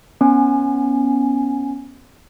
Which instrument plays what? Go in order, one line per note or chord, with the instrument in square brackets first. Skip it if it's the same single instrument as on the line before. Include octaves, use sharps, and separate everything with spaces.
[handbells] B3 C#4 G#5